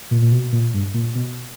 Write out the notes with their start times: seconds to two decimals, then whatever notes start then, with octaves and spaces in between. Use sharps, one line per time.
0.11 A#2
0.22 A#2
0.32 B2
0.52 A#2
0.74 G2
0.94 A#2
1.15 B2